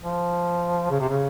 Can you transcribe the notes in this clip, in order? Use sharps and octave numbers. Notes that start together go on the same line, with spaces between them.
F3
C#3
C3
C#3